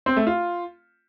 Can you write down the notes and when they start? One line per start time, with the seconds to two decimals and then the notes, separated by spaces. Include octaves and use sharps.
0.06 C4
0.16 A3
0.27 F4